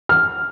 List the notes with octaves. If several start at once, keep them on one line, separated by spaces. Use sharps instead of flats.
F6